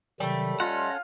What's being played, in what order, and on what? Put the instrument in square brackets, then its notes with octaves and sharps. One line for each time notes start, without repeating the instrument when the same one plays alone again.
[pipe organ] C3 D#3 F#3 [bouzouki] G3 A3
[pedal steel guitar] C#4 A4 F#5 [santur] F4 [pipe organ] D#5